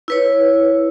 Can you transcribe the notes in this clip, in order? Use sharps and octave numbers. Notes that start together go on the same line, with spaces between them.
E4 B4 C#5